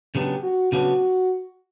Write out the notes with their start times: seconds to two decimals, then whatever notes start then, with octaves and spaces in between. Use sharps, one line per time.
0.15 C#3 F#3 B3 D4 G4
0.43 F#4
0.72 C#3 F#3 B3 D4 F#4